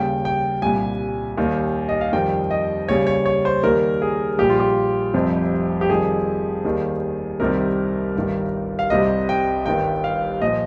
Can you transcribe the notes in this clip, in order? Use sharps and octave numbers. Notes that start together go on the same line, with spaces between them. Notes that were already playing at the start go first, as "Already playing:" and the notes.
Already playing: D#2 C#3 G3 G5
G5
C2 A#2 G3 G#5
D#2 D#3 G3
D#5
F5
F2 D#3 G3 G5
D#5
D#2 C#3 G3 C#5
C#5
C#5
C5
D#2 D#3 G3 A#4
G#4
A#1 A#2 G3 G4
F4
G4
F1 F2 C3 G3
G4
F2 D#3 G3 G#4
D#2 D#3 G3
C2 C3 D#3 G3 A#4
G1 G2 D#3 G3
F5
C2 C3 G3 D#5
G5
G1 G2 D#3 G3 G5
F5
A#2 F3 D#5